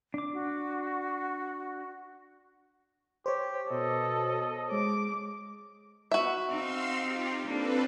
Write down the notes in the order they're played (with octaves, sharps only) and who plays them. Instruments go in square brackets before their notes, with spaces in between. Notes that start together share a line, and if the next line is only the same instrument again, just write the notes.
[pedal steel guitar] D4 D6
[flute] F#4
[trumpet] G4 [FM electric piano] C5 C#5
[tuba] B2 [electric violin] A4 [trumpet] D#5
[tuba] G#3 [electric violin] D6
[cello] B3 [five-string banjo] F#4 E5
[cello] C4 D#4 [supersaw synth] F5 C6 E6
[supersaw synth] F4 G4
[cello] A#3 D4 [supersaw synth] C4 A4 B4